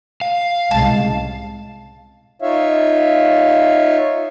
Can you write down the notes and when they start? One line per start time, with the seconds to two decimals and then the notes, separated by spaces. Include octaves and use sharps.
0.21 F5
0.71 C2 A2 C#3 G#3 A5
2.42 D#4 F4 C#5 E5 F5